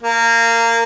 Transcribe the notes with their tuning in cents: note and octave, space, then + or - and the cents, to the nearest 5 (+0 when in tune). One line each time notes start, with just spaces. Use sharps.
A#3 -20